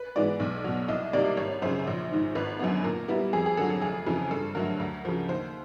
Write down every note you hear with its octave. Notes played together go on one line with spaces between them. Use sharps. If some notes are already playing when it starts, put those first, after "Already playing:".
Already playing: B4
G#2 E3 G#3 B3 D5
B1
B2 F#3
C2 D#5
C3 D#3 G3 A#3 D5
G#1 C#5
F#2 C#3 C5
A#1
G#2 D#3
G#1 B4
F#2 D3 F#3 B3
A#2 A#4
G3 B3 E4
F2 G#4
G#4
D3 F#3 A4
A4
F1 G#4
F2 C#3 E3
G2 A4
D3 F#3 A3 A#4
D2
C#3 F3
D#2 C5